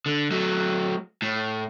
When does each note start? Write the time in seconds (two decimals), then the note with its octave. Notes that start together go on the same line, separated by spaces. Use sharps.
0.06 D3
0.31 F#3 A3
1.22 A2